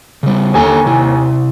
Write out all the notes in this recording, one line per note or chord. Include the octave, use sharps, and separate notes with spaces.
C#3 G3
D#2 D3 A4 G#5 A#5
C3 E4